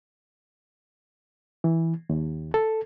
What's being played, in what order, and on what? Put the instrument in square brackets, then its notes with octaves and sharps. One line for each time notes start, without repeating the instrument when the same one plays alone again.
[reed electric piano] E3
D#2
A4